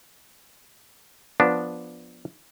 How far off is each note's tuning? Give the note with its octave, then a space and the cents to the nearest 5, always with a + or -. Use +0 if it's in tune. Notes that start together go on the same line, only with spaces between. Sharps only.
F3 +0 B3 -10 D4 +0